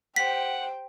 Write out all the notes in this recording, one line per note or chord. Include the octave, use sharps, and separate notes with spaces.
G4 C5 F#5 G5 B6